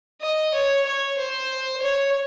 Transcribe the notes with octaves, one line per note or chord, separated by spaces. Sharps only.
D#5
C#5
C#5
C5
C#5